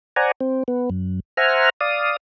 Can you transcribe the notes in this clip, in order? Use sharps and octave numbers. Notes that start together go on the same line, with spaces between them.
C5 D5 F#5 G#5 A#5
C4
B3
F#2
C5 E5 F#5 G#5 A#5 F6
D5 F5 D#6